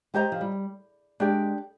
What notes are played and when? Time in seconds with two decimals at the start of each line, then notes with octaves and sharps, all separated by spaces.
0.14 G#3 G4 C5 D#5 A#5
0.32 F3
0.41 G3
1.20 G#3 D4 G4 D5